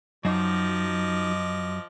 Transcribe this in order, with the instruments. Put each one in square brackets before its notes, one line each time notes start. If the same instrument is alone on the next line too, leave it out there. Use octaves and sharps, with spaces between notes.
[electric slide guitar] F#2 [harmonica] F3 D#5 D6 [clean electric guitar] F#3 D#4